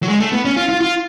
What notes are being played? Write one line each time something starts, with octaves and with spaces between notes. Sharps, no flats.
F#3
G#3
A3
B3
C#4
F4
F4
F4